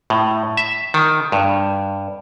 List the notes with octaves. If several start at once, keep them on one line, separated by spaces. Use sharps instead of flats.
A2
E5
D#3
G2